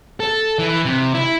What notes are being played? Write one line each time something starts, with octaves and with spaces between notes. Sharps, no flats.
A4
E3
C3
E4